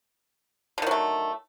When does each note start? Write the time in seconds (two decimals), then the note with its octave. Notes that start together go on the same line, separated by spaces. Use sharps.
0.78 D3
0.82 D#3
0.87 F#3
0.91 A3